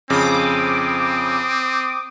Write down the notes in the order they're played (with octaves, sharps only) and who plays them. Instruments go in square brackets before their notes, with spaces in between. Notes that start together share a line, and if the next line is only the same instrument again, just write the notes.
[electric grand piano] F2 C#3 [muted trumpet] C4 [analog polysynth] D6 D#6